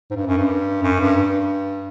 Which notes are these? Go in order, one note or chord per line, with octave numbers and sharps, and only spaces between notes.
G#2
G2
F#2
G2
F#2
G2
G2